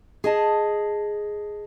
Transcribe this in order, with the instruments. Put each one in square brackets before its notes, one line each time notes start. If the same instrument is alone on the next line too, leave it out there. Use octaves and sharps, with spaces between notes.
[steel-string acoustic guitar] G#4 D#5 A5